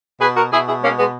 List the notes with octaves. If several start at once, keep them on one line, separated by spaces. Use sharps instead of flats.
B2 G#4 B4
F#4 A#4
B2 E4 G#4
E4 G#4
G#3 A#3 C#4
G#3 B3